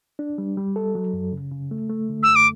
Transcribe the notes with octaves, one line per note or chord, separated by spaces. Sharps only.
D4
G3
G3
A4
F#3
F#2
C#3
C#3
A3
A3
D3
F#2 E6
D6